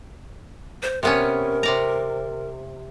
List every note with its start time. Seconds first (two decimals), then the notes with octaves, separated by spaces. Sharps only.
0.83 C5
1.03 C3 B3 C#4 A#4
1.63 C3 D5 A#5